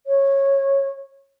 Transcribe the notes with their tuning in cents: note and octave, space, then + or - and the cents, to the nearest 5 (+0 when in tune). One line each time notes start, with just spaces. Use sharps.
C#5 -15